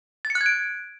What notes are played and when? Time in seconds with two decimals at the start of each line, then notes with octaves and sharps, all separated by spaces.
0.25 A6
0.30 C#7
0.35 F#6
0.41 G#6
0.46 D7